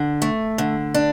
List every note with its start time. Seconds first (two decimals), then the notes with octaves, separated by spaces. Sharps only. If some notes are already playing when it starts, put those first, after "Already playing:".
Already playing: D3
0.22 A3
0.58 D3
0.94 D4